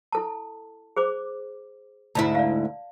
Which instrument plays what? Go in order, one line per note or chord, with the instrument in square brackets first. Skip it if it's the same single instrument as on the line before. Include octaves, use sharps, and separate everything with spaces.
[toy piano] E4 A4 A5
G#4 C5 D6
[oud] D2 G#2 E4 [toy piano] A5
[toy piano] D5 F5